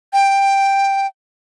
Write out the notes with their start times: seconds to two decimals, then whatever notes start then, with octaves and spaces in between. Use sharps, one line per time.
0.13 G5